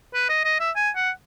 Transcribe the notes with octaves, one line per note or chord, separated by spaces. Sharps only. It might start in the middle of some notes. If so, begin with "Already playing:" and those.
B4
D#5
D#5
E5
G#5
F#5